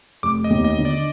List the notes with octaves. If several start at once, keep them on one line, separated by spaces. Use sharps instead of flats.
F1 D6
D#5
D#2
D#5
D3
D5